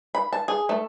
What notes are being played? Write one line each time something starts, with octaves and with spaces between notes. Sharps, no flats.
B5
A5
G#4
A3